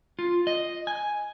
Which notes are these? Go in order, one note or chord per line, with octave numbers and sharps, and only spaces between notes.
F4
D#5
G#5